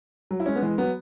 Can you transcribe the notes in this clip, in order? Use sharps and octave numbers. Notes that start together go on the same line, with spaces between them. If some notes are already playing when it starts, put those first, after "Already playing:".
F#3
E4
G#3 C#4
B3
E3 G#3
F#3 B3